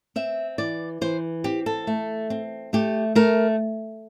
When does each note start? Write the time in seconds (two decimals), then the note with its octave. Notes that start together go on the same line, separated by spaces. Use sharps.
0.16 C4 E5
0.58 E3 D5
1.01 E3 C5
1.44 C4 G4
1.66 A4
1.87 A3
2.30 C4
2.73 A3 G4
3.15 A3 A#4